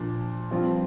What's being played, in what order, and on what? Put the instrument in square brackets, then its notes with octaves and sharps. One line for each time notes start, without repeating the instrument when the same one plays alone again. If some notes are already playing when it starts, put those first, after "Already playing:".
Already playing: [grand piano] A#2 F3 D4
G2 F3 C4 F4